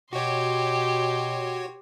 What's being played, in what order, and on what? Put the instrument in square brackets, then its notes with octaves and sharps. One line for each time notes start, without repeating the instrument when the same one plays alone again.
[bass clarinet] B2 [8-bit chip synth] F#4 C#5 [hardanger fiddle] G4 C6